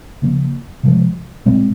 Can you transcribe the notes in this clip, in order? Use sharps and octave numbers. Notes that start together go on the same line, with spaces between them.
C#3 F3 A#3
C3 F3 G#3
A#2 G#3 C4